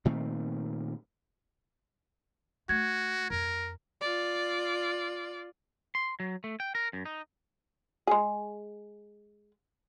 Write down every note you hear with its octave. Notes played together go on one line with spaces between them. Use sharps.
A#2 D#3 A3 C4
A3 F#4 G#6
F2 A#4
F4 D5
C6
F#3
A3
G5
A#4
F#2
D#4
G#3 G#4